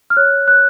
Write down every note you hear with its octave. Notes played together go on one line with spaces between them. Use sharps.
F6
C#5 F#6
F#6